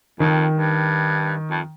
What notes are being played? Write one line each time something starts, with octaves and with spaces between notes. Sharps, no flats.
F2 D#3
G2
F2